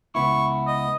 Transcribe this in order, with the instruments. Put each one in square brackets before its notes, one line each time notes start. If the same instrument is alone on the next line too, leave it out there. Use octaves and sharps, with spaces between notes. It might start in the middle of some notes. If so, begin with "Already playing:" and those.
[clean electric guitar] C#2 B3 E4 [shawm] C#6
[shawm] D#5